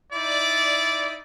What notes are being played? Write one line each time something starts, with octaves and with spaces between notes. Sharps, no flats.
D#4 E4 D5